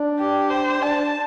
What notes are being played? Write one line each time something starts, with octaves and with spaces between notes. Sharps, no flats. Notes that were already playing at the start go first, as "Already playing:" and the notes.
Already playing: D4
G4
C5
D4 A5